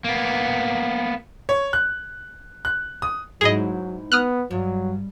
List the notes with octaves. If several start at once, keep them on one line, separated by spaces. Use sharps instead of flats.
A#3 B3
C#5
F#6
F#6
D#6
G#2 F#3 E4 G#4 D#5
B3 D#6 F6 F#6
G2 F#3